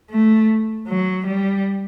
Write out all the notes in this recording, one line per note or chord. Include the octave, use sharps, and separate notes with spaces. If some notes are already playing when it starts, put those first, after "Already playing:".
A3
F#3
G3